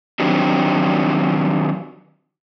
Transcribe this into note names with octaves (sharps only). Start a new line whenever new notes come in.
D#3 F#3 C4 D4 G4